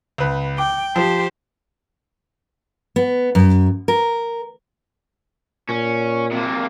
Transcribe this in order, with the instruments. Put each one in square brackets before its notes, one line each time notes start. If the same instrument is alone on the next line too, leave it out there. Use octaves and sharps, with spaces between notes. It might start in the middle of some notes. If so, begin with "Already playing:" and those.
[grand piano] C#2 B4
[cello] G5 [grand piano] D6
[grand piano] F3 [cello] G4 C5
[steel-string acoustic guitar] B3
F#2
A#4
[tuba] A#2 [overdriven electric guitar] C#4
[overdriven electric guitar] C3 A#3